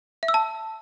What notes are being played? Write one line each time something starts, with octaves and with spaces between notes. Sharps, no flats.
E5
E6
A5